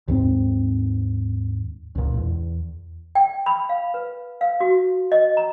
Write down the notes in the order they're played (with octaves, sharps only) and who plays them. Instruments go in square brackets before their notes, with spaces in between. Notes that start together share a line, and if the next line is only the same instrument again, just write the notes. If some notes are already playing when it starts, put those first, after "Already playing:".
[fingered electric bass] D#2 G#2 C4
C#2 A#2
E2
[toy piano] G5
B5
F5
B4
F5
F#4
D#5
A#5